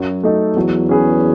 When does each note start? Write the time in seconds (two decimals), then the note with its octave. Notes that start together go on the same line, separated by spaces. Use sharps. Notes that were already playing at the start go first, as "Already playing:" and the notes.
Already playing: F#2 F#3
0.23 A3 D#4 A4
0.56 E2 F#3
0.89 C#4 G#4 B4